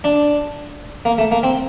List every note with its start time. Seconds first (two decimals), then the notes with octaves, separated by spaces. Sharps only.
0.04 D4
1.05 A#3
1.18 A3
1.32 A#3
1.43 C4